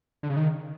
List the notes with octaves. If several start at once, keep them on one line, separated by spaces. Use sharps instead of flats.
D3
C#3
D#3